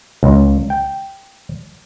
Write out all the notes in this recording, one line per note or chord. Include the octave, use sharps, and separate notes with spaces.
C#2
G5